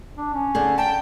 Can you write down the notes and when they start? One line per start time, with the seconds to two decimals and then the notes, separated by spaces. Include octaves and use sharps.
0.17 D4
0.34 C#4
0.55 D3 D#4 G#4
0.78 G5 A5